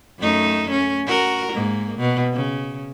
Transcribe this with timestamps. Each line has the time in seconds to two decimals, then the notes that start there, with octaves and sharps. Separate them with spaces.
0.19 F#2 A3 D#4
0.71 C#4
1.07 F#4 A#4
1.52 G#2 A#3
1.98 B2
2.33 C#3